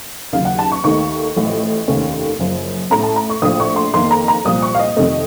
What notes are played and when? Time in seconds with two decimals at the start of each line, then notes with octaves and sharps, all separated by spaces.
0.32 D#2 C#3 F#3 F5
0.45 F#5
0.59 A5
0.72 C#6
0.84 D#2 D#3 A3 D#4 C#6
1.36 A1 A2 F3
1.88 F1 D#2 D#3 A3 C#4
2.39 F#1 F#2 F3
2.90 A2 A3 C#4 A#5
3.03 A5
3.16 A#5
3.29 C#6
3.42 A#1 A2 F3 A3 D#6
3.60 C#6
3.76 C6
3.94 F2 D#3 A#3 C6
4.11 A#5
4.28 A#5
4.45 C2 A#2 F3 D#6
4.63 C#6
4.75 F5
4.79 D#5
4.97 F1 F2 C3 D#3 A3 D#5